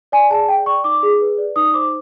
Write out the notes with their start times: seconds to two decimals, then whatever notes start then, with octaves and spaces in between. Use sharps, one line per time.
0.12 D5 G#5
0.30 G#4 A5
0.48 D5 G5
0.66 D5 C#6
0.84 D#4 D6
1.03 G#4
1.20 B4
1.38 D5
1.56 D#4 D#6
1.74 C5 D6